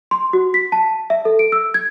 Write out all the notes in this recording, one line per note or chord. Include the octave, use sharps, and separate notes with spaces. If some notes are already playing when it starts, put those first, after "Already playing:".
C6
F#4
B6
A5
E5
A4
D7
E6
G#6